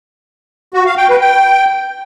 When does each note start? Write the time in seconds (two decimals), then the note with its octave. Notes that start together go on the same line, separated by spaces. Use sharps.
0.74 F#4
0.86 F5
0.97 G5
1.09 B4
1.21 G5